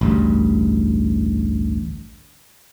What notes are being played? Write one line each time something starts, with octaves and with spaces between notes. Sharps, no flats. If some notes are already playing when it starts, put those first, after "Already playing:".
A1 D2 G2